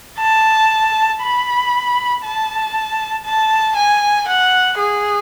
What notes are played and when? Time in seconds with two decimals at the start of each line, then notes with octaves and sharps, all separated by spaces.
0.19 A5
1.22 B5
2.24 A5
3.25 A5
3.76 G#5
4.28 F#5
4.79 G#4